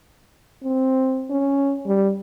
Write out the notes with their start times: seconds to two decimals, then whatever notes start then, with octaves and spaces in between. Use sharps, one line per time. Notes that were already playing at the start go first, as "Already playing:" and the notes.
0.64 C4
1.30 C#4
1.86 G3